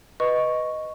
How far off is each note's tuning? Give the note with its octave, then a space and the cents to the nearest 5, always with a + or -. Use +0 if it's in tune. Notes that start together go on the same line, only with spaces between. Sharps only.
B4 +0 D#5 +0 C#6 +0